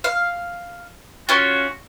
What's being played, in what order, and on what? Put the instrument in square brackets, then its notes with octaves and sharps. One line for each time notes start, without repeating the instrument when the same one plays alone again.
[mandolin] F5
[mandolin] C#4 F4 [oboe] F#4